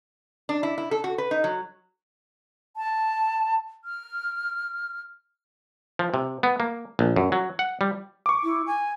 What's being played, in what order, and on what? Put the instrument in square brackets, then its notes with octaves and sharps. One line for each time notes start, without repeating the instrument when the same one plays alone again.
[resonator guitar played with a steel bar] D4
E4
E4
A4
F#4
B4
D#4
F#3
[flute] A5
F6
[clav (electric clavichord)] F3
C3
B3
A#3
A#1
F#2
F#3
F#5
G3
[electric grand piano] C#6 D6
[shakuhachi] E4
G#5